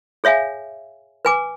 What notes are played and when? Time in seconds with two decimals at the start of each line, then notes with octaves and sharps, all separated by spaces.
0.24 G#4 C#5 E5 F5 G#5
1.25 B4 G#5 D6